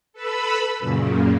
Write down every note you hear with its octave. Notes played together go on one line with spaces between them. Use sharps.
A4 B4 B5 E6
F#2 A#2 C#3